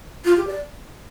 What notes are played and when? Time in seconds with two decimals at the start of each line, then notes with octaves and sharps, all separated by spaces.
0.25 F4
0.37 G4
0.47 D5